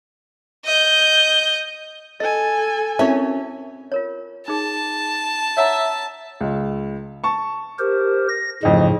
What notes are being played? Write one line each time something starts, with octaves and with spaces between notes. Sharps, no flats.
D#5 G6
A4 D#5 G#5 A6
C4 C#4 E4 C#5 E5
F4 A#4 C#5
D#4 G#4 A5
C#5 E5 F#5 A#5
C#2
A5 C#6
G4 A#4 C5
A#6
A1 F2 G#2 C#3 D#4